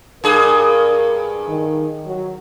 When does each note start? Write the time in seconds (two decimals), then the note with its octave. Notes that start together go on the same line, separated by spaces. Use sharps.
0.24 G2 G#4 A#4
1.48 D#3
2.06 F#3